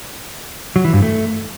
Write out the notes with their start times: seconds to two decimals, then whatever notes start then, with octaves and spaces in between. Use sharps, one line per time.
0.76 F#3
0.85 E3
0.93 G2
1.02 A3